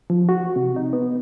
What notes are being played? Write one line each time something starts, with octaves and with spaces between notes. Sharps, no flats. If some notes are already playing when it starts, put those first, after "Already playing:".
F3
F#4
C3
D#4
B3